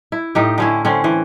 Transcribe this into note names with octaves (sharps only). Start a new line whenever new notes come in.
E4
A2 D#4 G4
D3 C#4 E4
D3 C4 C#4
E3